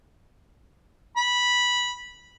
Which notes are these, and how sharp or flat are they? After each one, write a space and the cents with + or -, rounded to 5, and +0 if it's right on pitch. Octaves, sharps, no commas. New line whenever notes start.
B5 -10